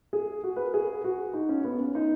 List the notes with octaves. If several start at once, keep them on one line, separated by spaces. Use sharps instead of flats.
G#4
F#4
B4
A#4
G#4
F#4
D#4
C#4
B3
C#4
D#4